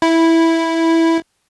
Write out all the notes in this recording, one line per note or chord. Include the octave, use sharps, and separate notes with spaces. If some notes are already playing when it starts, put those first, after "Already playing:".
E4